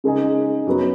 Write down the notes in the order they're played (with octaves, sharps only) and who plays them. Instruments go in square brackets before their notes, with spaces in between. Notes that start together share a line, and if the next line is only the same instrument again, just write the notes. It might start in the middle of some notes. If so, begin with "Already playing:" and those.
[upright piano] C#3 G#3 D#4 G#4
F#2 F#3 B3 F#4